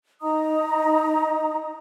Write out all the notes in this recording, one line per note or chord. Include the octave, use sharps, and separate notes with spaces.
D#4 D#5 A#5 D#6